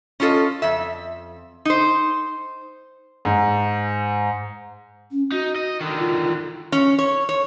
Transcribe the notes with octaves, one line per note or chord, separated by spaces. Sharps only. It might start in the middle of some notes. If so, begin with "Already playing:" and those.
C#4 D4 F4 A4 D#5
F2 E5
D#4 C5
G#2
C#4
D#4 F#4
D#5
D3 D#3
F4
C#4
C#5
C#5